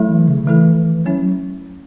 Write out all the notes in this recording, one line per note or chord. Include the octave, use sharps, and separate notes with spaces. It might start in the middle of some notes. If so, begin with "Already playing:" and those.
Already playing: F#3 A3 E4 A4 E5
E3
C#3
C#3
E3 A3 E4 A4
E3
E3
F#3 C#4 E4 C#5 E5
F#3